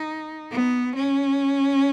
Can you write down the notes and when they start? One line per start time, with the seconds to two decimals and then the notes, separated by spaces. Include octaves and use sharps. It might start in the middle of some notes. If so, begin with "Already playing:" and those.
Already playing: D#4
0.51 B3
0.95 C#4